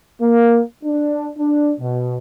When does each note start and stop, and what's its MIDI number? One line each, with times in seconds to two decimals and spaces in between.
0.21 0.61 58
0.84 1.29 62
1.38 1.71 62
1.80 2.18 47